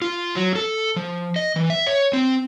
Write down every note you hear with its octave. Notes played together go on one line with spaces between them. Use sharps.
F4
F#3
A4
F3
D#5
E3
E5
C#5
C4